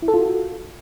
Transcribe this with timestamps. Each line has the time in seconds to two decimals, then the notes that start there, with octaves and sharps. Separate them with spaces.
0.02 E4
0.08 A4
0.14 F4
0.19 F#4